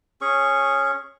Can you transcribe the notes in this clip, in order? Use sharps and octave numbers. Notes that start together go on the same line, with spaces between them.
C#4 G#4 C#6